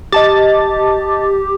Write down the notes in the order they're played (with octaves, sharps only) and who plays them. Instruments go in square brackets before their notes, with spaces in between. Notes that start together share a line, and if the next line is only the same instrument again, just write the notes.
[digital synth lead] G4 [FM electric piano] D#5 A5 A6